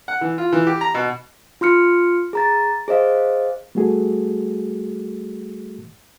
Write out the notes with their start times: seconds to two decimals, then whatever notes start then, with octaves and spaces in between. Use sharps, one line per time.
0.08 F#5
0.21 E3
0.38 F4
0.53 E3
0.67 G4
0.81 A#5
0.94 B2
1.61 F4 C6 F6 C#7
2.33 G#4 A#5 A6
2.88 G#4 C5 D#5 F5
3.75 G3 A3 F#4 G#4 A4